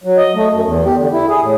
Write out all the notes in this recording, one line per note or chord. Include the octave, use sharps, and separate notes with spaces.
F#3
D#5
A3
F#2
E2
G4
D3
E4
G#4
A2